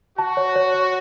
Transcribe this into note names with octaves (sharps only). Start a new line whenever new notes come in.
F#4 A5
C#5
C#5
C#5